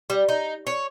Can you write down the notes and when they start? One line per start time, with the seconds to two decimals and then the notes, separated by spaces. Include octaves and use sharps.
0.10 G3
0.29 D#4
0.67 C#5